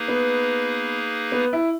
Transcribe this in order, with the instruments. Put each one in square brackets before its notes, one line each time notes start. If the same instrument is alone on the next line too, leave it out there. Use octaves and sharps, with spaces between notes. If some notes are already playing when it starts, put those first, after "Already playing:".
Already playing: [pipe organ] A#3 D#4 G#4 B4
[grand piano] B3
B3
E4